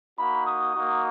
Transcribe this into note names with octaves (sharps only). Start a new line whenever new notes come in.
A#3 D#4 F#4 B5
D#6
A#3 D#4 F#4